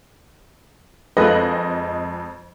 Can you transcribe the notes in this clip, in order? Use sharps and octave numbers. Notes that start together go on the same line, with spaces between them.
F2 G#3 F4 A4 B4 D#5